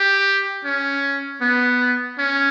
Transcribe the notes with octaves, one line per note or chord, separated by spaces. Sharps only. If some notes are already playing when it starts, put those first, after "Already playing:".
Already playing: G4
C#4
B3
C#4